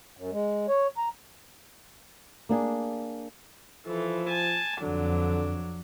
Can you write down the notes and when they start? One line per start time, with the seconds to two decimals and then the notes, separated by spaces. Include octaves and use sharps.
0.17 F#2
0.32 G#3
0.68 C#5
0.97 A#5
2.49 A#3 D4 G#4
3.86 E3 F3 A4
4.29 G#5 A5
4.81 F2 D3 F#3 D4